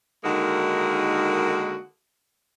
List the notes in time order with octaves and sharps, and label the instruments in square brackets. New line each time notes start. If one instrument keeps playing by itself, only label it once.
[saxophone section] D3 D#3 G#3 A#3 D#4 F#4